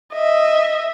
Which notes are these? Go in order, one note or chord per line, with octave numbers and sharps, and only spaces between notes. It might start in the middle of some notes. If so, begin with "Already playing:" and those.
D#5 E5